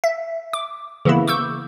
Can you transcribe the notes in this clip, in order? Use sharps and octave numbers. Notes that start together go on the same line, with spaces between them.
E5
D6
C#3 E3 A#3 B3 E4
C#6 D6 E6 G6